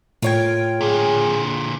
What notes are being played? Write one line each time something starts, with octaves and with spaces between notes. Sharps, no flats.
A2 F4 A#4 C#5 G5 G#6
A#2 D3 G#4